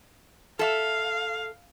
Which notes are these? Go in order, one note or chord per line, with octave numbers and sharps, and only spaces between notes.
A4 E5 F5